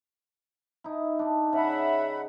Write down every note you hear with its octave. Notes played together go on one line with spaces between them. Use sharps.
D#4 E4
D4 D#4
C#3 E5 F#5 B5